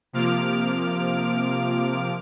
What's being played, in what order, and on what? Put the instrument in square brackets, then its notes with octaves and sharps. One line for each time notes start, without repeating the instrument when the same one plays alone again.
[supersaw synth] C3 F3 A#3 D6 F6 D7